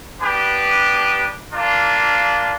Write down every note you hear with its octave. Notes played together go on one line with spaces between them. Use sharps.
B3 D4 G4 B4
A#3 D4 F4